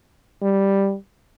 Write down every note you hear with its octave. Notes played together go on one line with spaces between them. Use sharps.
G3